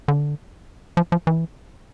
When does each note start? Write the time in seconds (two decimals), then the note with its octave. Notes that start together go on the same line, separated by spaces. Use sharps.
0.08 D3
0.97 F3
1.12 F3
1.27 E3